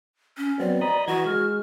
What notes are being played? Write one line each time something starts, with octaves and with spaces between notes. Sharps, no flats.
C#4
F#3 B3 C4 D5
D#5 A#5 B5 D#6
E3 F#4 F#5 G#6
G#3 F6